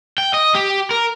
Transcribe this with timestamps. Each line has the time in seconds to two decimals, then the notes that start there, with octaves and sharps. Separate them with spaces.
0.18 G5
0.34 D#5
0.55 G4
0.91 A#4